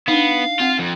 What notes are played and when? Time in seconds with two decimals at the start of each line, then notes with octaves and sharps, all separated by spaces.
0.08 B3 D4 D#4 F5
0.60 C4 F4 F#5
0.80 F2